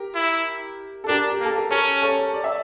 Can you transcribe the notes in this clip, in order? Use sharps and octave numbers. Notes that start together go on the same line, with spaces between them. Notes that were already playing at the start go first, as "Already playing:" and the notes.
Already playing: G4 A#4
E4
A4
D4 G4 A#4
G4
A#3
A4
A#4
C#4 A4 C#5
A4 C#5
D5
E5